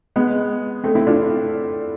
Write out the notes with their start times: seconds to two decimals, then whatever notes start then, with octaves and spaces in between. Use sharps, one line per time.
0.16 G#3 B3
0.83 A3 C4
0.95 C4 E4
1.07 D4 F4